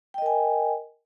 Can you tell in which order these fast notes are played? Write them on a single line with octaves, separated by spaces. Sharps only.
G5 D#5 A#4 G#5